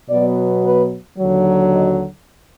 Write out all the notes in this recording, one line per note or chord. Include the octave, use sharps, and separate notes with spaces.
B2 F#3 B3 D5
B4
D#2 D3 F#3
D#5